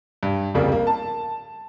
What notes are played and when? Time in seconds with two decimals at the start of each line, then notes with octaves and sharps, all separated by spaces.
0.23 G2
0.54 C2 F2 C#3 G3 A#3
0.72 A#3
0.87 A5